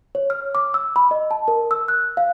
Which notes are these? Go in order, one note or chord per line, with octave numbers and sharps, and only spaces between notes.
C#5
F6
D6
E6
B5
D#5
A5
A#4
E6
F#6
F5